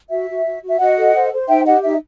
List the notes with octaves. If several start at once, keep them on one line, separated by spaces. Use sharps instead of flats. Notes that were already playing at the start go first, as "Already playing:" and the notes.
F#4 E5
F#4
F#4
F#4
E5
F#4 D#5 F#5
A4
C5
C5
D#4 E5 G5
G4 D#5 F#5
D#4 E5